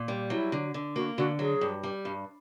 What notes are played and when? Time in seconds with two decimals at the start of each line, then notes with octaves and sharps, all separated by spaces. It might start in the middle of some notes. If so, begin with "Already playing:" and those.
Already playing: A#2
0.08 G3
0.30 F#3 E4
0.52 D3
0.74 D3
0.96 A#3 F#4
1.18 D3 F#4
1.39 F#3 G#4
1.61 G2
1.83 G3
2.05 G2